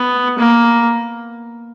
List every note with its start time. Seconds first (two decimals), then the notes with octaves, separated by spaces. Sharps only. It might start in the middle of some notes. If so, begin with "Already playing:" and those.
Already playing: B3
0.38 A#3